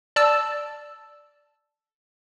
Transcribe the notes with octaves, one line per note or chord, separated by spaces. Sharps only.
D5 A5 E6